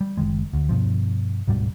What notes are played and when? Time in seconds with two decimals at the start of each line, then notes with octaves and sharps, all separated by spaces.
0.01 G3
0.17 F#1 D#3 G#3
0.53 D2
0.69 G2 B2 F3
1.47 D1 G#2 B2 G3